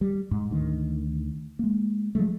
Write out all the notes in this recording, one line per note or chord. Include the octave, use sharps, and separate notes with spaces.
G3
G#2
D2 D#3
G#3 A#3
F3 F#3 G#3 A3